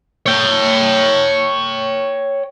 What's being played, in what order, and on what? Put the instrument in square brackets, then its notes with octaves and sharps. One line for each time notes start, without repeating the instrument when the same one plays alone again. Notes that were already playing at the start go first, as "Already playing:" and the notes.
[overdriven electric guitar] C#5 G5